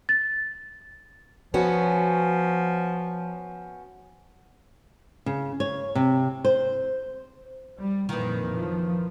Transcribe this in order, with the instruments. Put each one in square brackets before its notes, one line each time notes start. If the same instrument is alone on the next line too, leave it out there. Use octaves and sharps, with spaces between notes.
[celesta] A6
[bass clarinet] F3 [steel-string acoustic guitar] B3 C#4 F#4
[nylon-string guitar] C#3
C#5
C3
C5
[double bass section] G3
[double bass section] F2 A#2 [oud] D#3 E3
[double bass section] F3